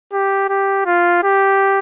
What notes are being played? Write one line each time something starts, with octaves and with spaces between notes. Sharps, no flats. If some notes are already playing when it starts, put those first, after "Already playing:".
G4
G4
F4
G4